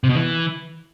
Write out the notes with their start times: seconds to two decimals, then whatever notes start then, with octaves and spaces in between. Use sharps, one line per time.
0.04 C3
0.09 B2
0.15 E3